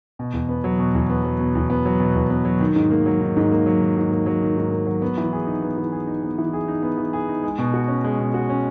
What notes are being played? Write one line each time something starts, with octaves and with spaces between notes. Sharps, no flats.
B2
E2
B3
F#3
B2
E2
B3
F#3
B2
E2
B3
F#3
B2
E2
B3
F#3
D#3
G#2
A#3
F#3
D#3
G#2
A#3
F#3
D#3
G#2
A#3
F#3
D#3
G#2
A#3
F#3
B3
E3
G#4
D#4
B3
E3
G#4
D#4
B3
E3
G#4
D#4
B3
E3
G#4
D#4
G#3
B2
F#4
C#4
G#3
B2
F#4
C#4